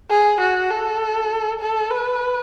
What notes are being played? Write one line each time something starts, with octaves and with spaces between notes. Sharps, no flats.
G#4
F#4
A4
A4
B4